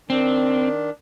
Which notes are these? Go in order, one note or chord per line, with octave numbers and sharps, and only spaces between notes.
D#3 C4 D4